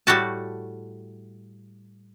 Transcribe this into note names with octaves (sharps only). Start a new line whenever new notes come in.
A2 G3 A3 F#4 A5